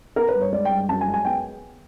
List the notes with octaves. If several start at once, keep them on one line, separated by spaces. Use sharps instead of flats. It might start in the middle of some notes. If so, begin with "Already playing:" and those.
B3 A#4
B4
G2
C#5
G#3 D5
G5
G2
F#2 A5
G#5
G#3
G#5
B3 G5